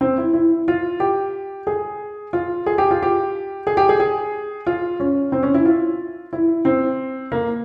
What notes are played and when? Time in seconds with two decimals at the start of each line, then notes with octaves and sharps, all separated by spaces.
0.01 C4
0.18 E4
0.33 E4
0.68 F4
1.00 G4
1.67 G#4
2.33 F4
2.66 G#4
2.78 G4
2.91 F4
3.02 G4
3.67 G#4
3.77 G4
3.89 G#4
4.00 G#4
4.67 F4
5.00 C#4
5.32 C4
5.43 C#4
5.54 E4
5.65 F4
6.33 E4
6.65 C4
7.32 A#3